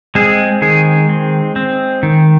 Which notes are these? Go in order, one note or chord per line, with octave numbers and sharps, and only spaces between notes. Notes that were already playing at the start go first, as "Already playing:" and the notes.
G#3 C4 G#4
D#3 G#3 G#4
C4
C4
D#3